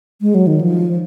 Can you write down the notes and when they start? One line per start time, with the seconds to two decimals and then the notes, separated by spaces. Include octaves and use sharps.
0.21 G#3
0.35 F#3
0.47 D#3
0.61 F3